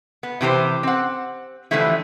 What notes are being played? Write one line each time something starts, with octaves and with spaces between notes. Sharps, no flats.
B3
C3 E3 G4 C5
C4 F#5
D3 E3 F3 G3 A3 E4